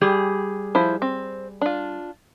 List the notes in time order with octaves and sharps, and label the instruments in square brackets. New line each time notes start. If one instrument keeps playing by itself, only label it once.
[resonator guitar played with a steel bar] G3 G4 G#4
[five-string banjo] F3 E4 C5
C4
D4 F4